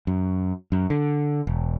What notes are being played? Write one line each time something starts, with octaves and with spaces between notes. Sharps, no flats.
F#2
F#2
D3
E1